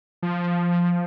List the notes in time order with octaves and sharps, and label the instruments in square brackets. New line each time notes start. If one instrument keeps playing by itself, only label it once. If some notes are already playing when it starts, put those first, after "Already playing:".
[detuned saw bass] F3